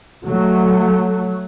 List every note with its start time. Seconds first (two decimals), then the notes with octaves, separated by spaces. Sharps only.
0.23 F#3 A3